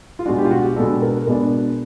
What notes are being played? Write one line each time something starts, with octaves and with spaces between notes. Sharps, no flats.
F4
B2 G#3 B3 D4 F#4
G4
F4
F#4
G4
B2 G#3 B3 D4 A4
A#4
B2 G#3 B3 D4 A#4